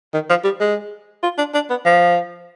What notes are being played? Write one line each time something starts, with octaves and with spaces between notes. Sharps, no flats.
D#3
F3
G3
G#3
F4
D4
D4
B3
F3